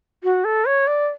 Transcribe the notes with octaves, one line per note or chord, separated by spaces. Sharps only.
F#4
A4
C#5
D5